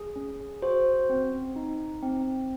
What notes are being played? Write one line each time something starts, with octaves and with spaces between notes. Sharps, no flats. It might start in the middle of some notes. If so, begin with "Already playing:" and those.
Already playing: G#4
C#4
F#4 C5
C4
D#4
C4